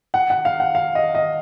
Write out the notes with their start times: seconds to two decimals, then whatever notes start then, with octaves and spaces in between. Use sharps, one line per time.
0.14 F#5
0.30 F#5
0.45 F5
0.60 F#5
0.75 F5
0.95 D#5
1.15 D#5